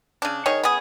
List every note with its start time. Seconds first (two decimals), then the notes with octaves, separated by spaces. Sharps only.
0.22 C#3 D4
0.46 D#3 G#4 C#5
0.63 B3 G#4